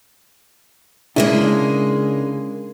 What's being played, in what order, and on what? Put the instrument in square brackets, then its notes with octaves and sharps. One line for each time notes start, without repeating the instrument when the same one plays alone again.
[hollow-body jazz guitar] C#3 D4 E4 [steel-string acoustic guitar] G#3 A#3 G#4